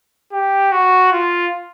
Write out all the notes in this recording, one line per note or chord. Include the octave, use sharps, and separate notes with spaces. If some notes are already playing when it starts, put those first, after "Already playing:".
G4
F#4
F4